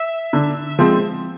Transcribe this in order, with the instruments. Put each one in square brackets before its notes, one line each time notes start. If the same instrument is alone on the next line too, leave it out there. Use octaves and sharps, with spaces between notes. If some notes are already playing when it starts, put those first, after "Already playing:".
Already playing: [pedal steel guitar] E5
[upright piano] D3
F3 G#3 C4